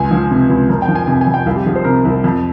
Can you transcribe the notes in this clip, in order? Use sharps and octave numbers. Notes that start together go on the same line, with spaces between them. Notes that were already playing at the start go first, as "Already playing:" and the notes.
Already playing: C#2 G#5
F3
C3
C#2
F2 A#4
G5
F3
G#5
C3 G#5
G#5
F2
G5
C2 F5
G4
F3 G#4
C5
C3 A#4
C2
F2